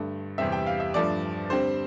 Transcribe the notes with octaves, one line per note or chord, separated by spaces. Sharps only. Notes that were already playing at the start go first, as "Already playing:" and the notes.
Already playing: G2 D3 A3
E2 C3 G3 C4 E5
G5
F5
E5
G2 F3 A3 D4 D5
D3 G3 C4 C5